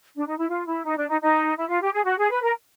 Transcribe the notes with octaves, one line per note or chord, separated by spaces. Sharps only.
D4
D#4
E4
F4
E4
D#4
D4
D#4
D#4
E4
F4
G4
G#4
F#4
G#4
B4
A#4